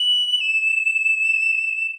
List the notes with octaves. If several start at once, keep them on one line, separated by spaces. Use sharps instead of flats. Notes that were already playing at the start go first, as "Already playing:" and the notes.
Already playing: F#7
E7